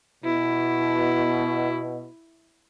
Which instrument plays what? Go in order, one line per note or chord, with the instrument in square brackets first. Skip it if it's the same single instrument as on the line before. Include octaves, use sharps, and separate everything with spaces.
[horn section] B2 [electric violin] E4